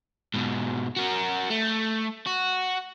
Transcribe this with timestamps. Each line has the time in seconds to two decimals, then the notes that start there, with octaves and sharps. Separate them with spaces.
0.34 G#2 B2
0.96 F#4 A#4
1.50 A3
2.26 F#4